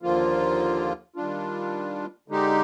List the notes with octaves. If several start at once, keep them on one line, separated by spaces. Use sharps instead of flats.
D#2 D3 F3 A#3 F4
D#3 G3 D4 F4
D3 G#3 D#4 G4